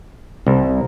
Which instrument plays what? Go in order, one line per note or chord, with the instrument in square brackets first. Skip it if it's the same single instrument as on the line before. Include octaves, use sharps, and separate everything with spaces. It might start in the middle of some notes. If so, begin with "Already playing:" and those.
[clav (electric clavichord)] C2